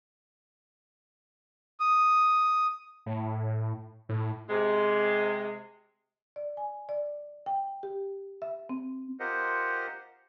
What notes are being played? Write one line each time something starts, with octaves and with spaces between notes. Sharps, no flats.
D#6
A2
A2
C3 G#3
D5
G#5
D5
G5
G4
E5
C4
F4 G4 A#4 C5 D#5 F#5